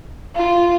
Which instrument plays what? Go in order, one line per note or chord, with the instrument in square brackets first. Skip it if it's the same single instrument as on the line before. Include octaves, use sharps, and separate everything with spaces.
[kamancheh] F4